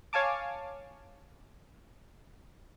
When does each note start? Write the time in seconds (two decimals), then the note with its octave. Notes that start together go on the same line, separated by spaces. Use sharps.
0.13 C#5 F5 G#5 A5 D6